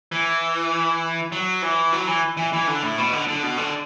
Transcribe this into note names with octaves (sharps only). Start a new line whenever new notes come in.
E3
F#3
E3
F#3
E3
E3
E3
D3
A2
B2
D3
D3
B2
D3